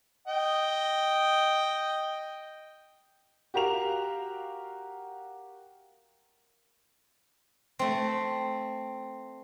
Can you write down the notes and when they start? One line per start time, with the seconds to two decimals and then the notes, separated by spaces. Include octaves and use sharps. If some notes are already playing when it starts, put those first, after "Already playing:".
0.28 D#5 G5
3.54 F#4 G4 A#4 F5 F7
7.79 A3 C4